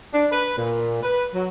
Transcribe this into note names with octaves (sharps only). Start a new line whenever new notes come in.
D4
B4
A#2
B4
F#3